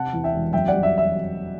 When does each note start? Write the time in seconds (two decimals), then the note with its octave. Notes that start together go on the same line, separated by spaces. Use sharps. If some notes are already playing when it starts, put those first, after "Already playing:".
Already playing: C3 F#5 A5
0.13 E2
0.24 E5 G5
0.34 E1
0.53 F#2 E5 G5
0.68 G3 D5 F#5
0.83 E5
0.98 E5